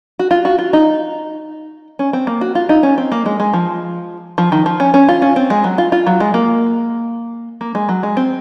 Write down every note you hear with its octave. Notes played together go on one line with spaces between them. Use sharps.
F#4
F4
F#4
F4
D#4
C#4
C4
A#3
F#4
F4
D#4
C#4
C4
A#3
G#3
G#3
F3
F3
D#3
F3
C#4
C#4
F4
C#4
C4
G#3
F#3
F4
F4
F#3
G#3
A#3
A#3
G#3
F#3
G#3
C4